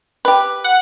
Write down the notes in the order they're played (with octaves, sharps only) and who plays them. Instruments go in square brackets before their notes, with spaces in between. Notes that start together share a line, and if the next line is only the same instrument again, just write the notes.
[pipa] G4 B4
[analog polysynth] F#5